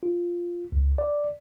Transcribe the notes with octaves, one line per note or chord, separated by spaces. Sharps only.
F4
C#2
D5